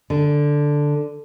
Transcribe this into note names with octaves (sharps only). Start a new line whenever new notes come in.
D3